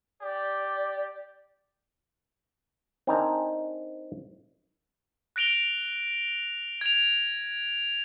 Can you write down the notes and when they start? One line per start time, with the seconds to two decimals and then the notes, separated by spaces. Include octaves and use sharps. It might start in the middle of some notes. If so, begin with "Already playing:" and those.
0.22 G4 D5
3.07 C4 D4 D#4 A#4 G#5 A#5
5.36 F#6 A#6 D7 F7 G7
6.81 G#6 F7